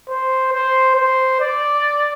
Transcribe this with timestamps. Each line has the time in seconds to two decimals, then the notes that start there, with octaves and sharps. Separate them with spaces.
0.09 C5
0.53 C5
0.96 C5
1.40 D5